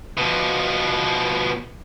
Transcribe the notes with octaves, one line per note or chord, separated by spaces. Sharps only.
B2 F3